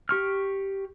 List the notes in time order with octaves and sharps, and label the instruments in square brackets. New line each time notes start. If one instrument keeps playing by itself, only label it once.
[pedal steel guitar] G4 C#6 F6